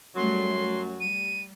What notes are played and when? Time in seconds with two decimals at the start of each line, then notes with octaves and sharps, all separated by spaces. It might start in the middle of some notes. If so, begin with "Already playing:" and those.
0.16 F#2 F#3 G3 A3 C6
1.00 G3 D#7